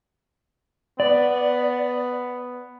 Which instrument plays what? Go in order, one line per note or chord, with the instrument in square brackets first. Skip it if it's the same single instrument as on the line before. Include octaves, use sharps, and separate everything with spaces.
[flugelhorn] B3 [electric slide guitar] D5